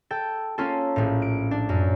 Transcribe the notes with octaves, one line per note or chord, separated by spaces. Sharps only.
A4 G5
A#3 C#4 F4 A4
A#1 A2
D7
D4
F#2